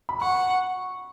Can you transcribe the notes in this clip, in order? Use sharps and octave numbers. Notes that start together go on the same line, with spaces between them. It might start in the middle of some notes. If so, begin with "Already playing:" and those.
B5
F#5 C#6